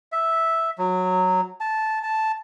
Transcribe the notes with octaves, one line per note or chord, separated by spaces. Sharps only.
E5
F#3
A5
A5